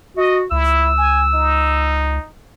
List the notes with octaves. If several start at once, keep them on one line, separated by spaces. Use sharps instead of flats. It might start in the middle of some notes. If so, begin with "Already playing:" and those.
F#4 D#5
C#2 E4 E6
G#5
D#4